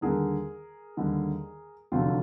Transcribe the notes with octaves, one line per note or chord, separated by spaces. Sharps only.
D#2 D3 G3 G#4 A#4
D#2 D3 G3
F1 F2 D3 F#3 F4 G4